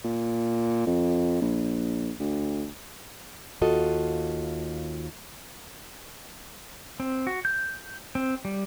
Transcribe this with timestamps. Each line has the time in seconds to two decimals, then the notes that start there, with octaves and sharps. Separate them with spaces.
0.05 A#2
0.87 F2
1.42 A#1
2.20 D2
3.61 D#2 F4 F#4 A4 D#5
7.00 C4
7.27 F#4
7.45 G6
8.15 C4
8.45 G3